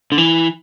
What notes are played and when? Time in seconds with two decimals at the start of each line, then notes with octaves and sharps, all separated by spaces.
0.12 D3
0.18 E3